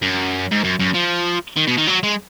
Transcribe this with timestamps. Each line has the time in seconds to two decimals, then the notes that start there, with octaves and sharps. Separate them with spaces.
0.02 F#2
0.52 G#2
0.64 F#2
0.79 F#2
0.94 F3
1.56 D#3
1.67 B2
1.77 D#3
1.87 F#3
2.03 G#3